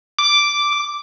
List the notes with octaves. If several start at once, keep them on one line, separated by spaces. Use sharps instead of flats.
D6